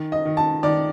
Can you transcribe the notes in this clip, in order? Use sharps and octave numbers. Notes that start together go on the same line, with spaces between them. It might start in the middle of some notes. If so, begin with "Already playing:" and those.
Already playing: D#3
D#5
D#3
A5
D#3 D5